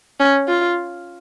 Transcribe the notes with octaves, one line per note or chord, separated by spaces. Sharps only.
C#4
F4